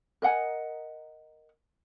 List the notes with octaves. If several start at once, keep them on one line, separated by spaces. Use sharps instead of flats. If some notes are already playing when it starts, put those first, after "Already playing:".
A#4 D#5 F#5 G#5